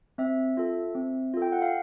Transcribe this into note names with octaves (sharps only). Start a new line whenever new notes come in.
C4 E5
F4 A4
C4
F4 A4
G5
F#5
F5